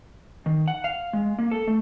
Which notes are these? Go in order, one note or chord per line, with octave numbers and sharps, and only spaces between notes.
D#3
F#5
F5
G#3
A#3
A4
A3